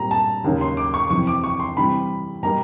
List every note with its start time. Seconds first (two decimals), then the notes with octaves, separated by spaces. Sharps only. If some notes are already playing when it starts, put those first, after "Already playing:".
Already playing: A#2 G3 C4 A#5
0.11 A5
0.44 D#2 C#3 F#3 A#3
0.61 C6
0.77 D6
0.94 C#6
1.10 F2 C3 E3 C#6
1.27 D6
1.44 C#6
1.60 C6
1.77 C3 E3 G3 C4 B5
2.43 B2 G3 A#3 A#5